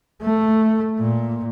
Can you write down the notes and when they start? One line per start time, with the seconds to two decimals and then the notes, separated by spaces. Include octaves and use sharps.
0.22 A3
0.99 A#2